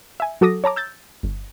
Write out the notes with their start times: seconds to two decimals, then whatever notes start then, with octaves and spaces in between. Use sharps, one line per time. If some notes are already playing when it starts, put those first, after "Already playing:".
0.20 E5 G#5
0.41 F#3 F#4 A4 D6 D#6 A#6
0.64 C#5 A5 A#5 D6
0.76 E6 G6 A6
1.23 G1